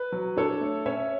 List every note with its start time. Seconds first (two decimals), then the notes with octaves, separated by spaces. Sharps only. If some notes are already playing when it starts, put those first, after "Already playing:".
Already playing: B4
0.12 F#3
0.36 D4 A4 C#5
0.61 A3
0.86 C#4 C#5 E5